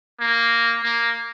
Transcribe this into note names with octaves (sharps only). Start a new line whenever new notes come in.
A#3
A#3